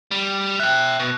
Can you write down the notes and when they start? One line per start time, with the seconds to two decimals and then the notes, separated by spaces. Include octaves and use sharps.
0.11 G3
0.60 E5 G5 F#6
0.99 B2